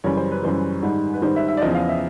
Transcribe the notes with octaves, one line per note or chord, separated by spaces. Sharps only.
F#2 C#3 E3 G3 C#5
C5
B4
F#2 C#3 E3 G3 C5
G#2 D#3 G3
B4
G#2 D#3 G3 C5
E5
E5
D5
E2 C#3 F3 D#5
F5
E5